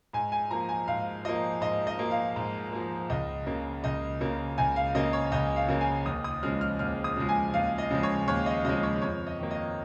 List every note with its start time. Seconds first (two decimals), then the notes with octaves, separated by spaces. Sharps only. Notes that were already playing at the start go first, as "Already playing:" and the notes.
0.13 G#2 G#5
0.32 G#5
0.50 F3 A#3 A#5
0.69 G#5
0.88 G#2 F5
1.25 F3 A#3 D#5
1.61 G#2 D#5
1.87 D#5
1.99 F3 A#3
2.11 F5
2.36 G#2
2.73 F3 A#3
3.10 C#2 D#5
3.47 C#3 A#3
3.84 C#2 D#5
4.21 C#3 A#3
4.58 C#2 G#5
4.76 F5
4.95 C#3 A#3 D#5
5.13 C#5
5.32 C#2 D#5
5.56 F5
5.68 C#3 A#3
5.81 G#5
6.06 D#2 D#6
6.24 D#6
6.43 C#3 F3 G#3 F6
6.61 F6
6.79 D#2 F6
7.04 D#6
7.17 C#3 F3 G#3
7.29 G#5
7.54 D#2 F5
7.78 D#5
7.91 C#3 F3 G#3
8.03 C#5
8.28 D#2 C#5
8.46 D#5
8.65 C#3 F3 G#3 D#5
8.83 C#5
9.02 F2 C#5
9.27 D#5
9.39 D#3 A#3
9.51 D#5